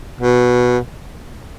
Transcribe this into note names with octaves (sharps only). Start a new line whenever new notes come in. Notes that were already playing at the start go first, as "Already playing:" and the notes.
B2